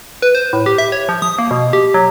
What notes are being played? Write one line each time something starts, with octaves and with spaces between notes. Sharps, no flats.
B4
C5
A2
G4
E5
C#5
F3
D#6
A#3
B2
G4
F#3